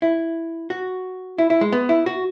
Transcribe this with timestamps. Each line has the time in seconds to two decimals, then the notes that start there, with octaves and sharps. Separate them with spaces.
0.02 E4
0.70 F#4
1.38 E4
1.50 E4
1.61 G#3
1.72 B3
1.89 E4
2.06 F#4